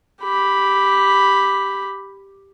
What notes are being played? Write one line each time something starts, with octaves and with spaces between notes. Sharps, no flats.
G4 B5